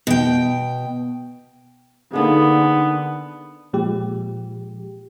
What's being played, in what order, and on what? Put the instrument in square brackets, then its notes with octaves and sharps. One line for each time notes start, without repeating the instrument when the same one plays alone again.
[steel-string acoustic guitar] B2 G5
[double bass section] D3 [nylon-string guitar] A#3 D4 G#4 [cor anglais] B3 [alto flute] D#4
[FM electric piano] A#2 F3 G#3 G4